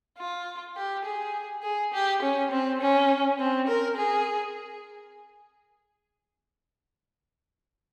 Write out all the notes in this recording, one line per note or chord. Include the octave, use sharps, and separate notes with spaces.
F4
G4
G#4
G#4
G4
C#4
C4
C#4
C4
A#4
G#4